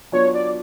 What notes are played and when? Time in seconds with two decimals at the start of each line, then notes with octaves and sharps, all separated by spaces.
0.12 F#3 B3 D4 F4 C#5
0.35 D5